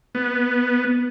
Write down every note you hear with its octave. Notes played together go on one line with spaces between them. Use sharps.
B3